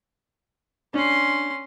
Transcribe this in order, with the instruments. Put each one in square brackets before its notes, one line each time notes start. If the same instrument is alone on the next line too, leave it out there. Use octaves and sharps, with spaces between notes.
[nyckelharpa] C#4 C6 [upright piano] D4